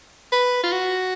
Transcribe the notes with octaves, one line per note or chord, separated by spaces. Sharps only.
B4
F4
F#4